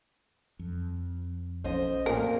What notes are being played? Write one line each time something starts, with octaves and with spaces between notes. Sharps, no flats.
F2
A#1 F3 C#4 C5 D#5
F2 A#2 A#4